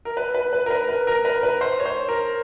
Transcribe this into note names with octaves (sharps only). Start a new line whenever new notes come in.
A#4
B4
B4
B4
A#4
B4
B4
A#4
B4
B4
C5
C#5
C5
A#4